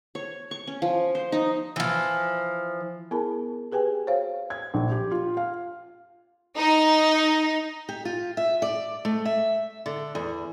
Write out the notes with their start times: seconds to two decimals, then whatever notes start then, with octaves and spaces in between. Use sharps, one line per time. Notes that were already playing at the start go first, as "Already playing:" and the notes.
0.15 C#5
0.51 C#6
0.67 C#4
0.82 F3
1.15 C5
1.32 D#4
1.76 E3 F3
3.11 B3 E4 G#4 A#4 A5 B5
3.72 G4 G#4 B4 G5 G#5
4.07 F#4 C5 C#5 F5
4.50 G#6
4.74 A#1
4.92 G4
5.11 F4
5.37 F5
6.57 D#4
7.89 G4
8.05 F4
8.37 E5
8.62 D5
9.05 A3
9.25 E5
9.86 D3
10.15 E2